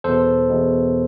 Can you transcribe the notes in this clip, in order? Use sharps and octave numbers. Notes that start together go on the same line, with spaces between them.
E2 B2 A4 C5
E2 B2